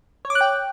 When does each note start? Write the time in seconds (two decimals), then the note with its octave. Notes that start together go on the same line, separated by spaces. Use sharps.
0.25 C#5
0.30 D6
0.35 F#6
0.41 G5